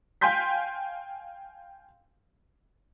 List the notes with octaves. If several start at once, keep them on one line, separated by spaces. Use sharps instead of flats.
F5 G5 G#5 C6 G6 B6